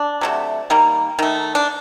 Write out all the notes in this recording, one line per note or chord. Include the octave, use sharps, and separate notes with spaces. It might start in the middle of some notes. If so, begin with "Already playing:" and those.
Already playing: D4
C3 F#3 A3
D#3 G3 A#3
D#3 A3
D4